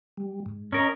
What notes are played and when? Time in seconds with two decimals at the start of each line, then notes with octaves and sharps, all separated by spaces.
0.17 G3
0.46 G#2
0.72 C#4 A#4 D#5 A#5